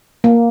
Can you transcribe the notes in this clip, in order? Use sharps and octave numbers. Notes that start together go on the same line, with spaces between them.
A#3